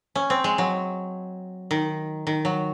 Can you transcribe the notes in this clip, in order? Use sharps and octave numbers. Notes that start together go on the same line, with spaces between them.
C#4
C4
G#3
F#3
D#3
D#3
F#3